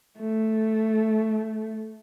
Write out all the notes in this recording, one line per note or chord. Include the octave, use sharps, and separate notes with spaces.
A3